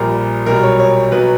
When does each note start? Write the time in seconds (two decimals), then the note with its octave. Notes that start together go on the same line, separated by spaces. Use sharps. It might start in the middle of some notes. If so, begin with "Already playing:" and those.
Already playing: A#1 A#2 G3 A#4
0.46 B1 B2 G3 A#4
0.63 C#5
0.79 C#5
1.12 B1 B2 F#3 B4